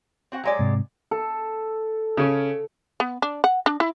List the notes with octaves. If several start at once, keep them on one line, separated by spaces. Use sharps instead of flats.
C4 F#4 F#5
F#3 G#3 D5
G#2 C3
A4
C#3 C#4
B3
D4
F#5
D4
E4